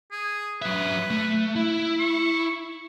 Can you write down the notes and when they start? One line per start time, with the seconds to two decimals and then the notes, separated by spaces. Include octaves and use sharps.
0.12 G#4
0.62 F#3 B4 E5
1.11 A3
1.56 E4
2.00 C#6